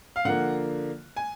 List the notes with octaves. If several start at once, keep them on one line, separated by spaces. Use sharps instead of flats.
F5
D3 F3 A#3 F#5
G#5